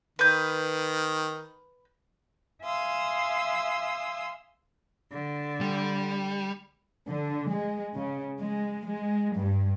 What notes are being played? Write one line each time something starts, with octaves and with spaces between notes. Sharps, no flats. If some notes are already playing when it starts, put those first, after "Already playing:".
D#3 B4 G6
E5 F5 G#5 C6 D#6 E6
D3
G3
D3
G#3
C#3
G#3
G#3
G2